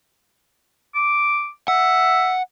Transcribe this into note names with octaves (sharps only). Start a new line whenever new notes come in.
D6
E5 F#5